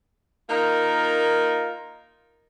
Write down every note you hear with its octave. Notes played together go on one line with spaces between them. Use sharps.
A#3 D#4 F4 A#4